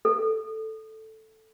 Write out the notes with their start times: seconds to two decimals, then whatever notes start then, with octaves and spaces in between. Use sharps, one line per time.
0.05 A4